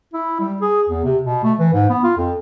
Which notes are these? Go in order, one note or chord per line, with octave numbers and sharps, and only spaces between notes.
E4
G3
G#4
E2
C3
B2
A3
E3
G#2
B3
F4
F2